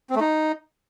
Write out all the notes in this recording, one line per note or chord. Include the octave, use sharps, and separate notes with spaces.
C4
A3
D#4